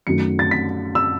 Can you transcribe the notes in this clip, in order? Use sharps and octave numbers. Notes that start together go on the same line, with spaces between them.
F#2 D#3 F#3 A3 C#7
A6
B6
E6